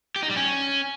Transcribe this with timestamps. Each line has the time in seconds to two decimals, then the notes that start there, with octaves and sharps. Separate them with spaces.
0.16 G4
0.23 D#4
0.29 G3
0.36 C#4